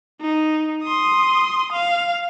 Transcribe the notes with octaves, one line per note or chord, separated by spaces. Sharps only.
D#4
C6 D#6
F5